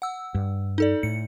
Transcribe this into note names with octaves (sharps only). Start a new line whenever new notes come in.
F#5 E6
G2
D#4 A4 D5
A2 C#7